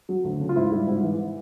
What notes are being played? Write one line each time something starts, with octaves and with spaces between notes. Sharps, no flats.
F#3
D2
C#3
F4
G#2 E4
G3
G#2
E3